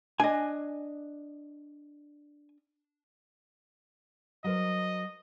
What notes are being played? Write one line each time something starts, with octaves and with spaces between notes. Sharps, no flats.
D4 D#5 G#5
F#3 A#4 C5 D#5